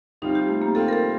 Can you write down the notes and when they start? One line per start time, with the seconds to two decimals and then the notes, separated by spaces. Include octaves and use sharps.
0.22 C3 G3 C4 D#4 F4
0.35 G4
0.48 A3
0.62 A#3
0.75 C3 G3 C4 F4 A4
0.88 A#4
0.93 A4